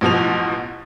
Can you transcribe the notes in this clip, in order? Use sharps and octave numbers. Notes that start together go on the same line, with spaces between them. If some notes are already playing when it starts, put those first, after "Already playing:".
A1 B2 F3 F7